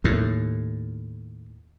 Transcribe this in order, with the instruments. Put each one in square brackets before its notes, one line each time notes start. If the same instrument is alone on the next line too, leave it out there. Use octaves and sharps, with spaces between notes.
[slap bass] D#2 A2